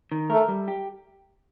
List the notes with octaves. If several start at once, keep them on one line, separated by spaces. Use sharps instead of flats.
D#3
A3 A#4
G3
G4